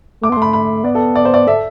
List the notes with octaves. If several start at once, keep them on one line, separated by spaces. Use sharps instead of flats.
A3 D6
B3
A3 C6
B5
B5
B3 D5
A4
D5
C5
D5
A4 E5